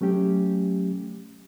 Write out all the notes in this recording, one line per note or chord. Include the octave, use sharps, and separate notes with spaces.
F#3 A3 C#4 G4